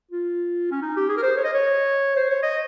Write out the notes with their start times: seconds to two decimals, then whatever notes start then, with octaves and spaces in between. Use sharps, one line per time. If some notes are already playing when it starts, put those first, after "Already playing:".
0.11 F4
0.71 C#4
0.82 D#4
0.96 G4
1.09 G#4
1.17 A#4
1.23 C5
1.37 C#5
1.44 D#5
1.54 C#5
2.16 C5
2.30 C#5
2.43 D#5